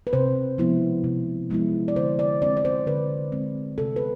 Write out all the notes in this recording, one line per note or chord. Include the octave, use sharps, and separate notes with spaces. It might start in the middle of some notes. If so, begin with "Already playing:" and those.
B4
C3 C5
F3 G#3 B3 E4
C3
F3 G#3 B3 E4
D5
D3 C5
D5
G#3 C4 D5
D5
C5
D3 B4
G#3 C4
C3 A4
B4